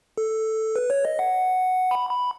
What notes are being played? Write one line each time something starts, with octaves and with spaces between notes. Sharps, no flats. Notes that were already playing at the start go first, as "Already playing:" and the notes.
A4
B4
C#5
D#5
F#5
B5
B5